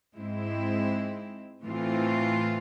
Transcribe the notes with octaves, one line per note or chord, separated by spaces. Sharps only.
G#2 G#3 C4 E4
A2 E3 A3 C4 F4